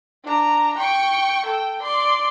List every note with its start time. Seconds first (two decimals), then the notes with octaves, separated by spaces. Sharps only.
0.25 D4 A#5
0.78 G5 C#6
1.46 A4 G5
1.82 D5 C6